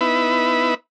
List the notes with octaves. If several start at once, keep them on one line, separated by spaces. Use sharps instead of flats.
B3 D#4 E4 B4 E5 B5